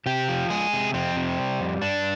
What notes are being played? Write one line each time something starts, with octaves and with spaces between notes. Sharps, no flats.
C3 G4
F3
G#3 G#4
C3
F2 C4
C3
G3
F2
G2 D4